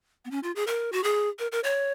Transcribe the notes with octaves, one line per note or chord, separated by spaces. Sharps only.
B3
C#4
F4
G#4
A#4
F#4
G#4
A#4
A#4
C#5